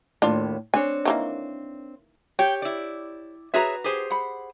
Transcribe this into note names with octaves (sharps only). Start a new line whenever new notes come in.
D#2 A2 D4 F4
C4 D4 C#5 G#5
D#3 E3 A#3
G4 C#5 G5
E4 D5
F#4 G#4 B4 C#5 E5 A#5
G4 G#4 C5
F#5 B5